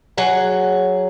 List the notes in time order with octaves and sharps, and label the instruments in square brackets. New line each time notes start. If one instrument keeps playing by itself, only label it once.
[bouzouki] F#3 G#4 F#5